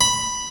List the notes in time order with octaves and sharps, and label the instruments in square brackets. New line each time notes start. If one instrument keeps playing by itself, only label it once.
[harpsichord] B5